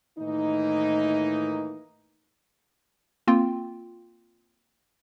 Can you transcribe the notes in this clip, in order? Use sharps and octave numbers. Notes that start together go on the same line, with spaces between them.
A2 D#3 E3 A#3 D#4
A#3 C4 F4 G5